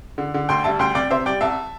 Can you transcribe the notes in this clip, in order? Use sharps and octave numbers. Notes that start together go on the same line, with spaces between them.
D3
D3
D2 G5 C6
G3 E5 A5
D2 G5 C6
C3 D5 G5
C3 C5 E5
G3 D5 G5
C2 E5 A5